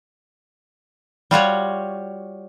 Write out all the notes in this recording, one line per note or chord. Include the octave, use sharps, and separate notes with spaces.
G3 F4 F#4 C#5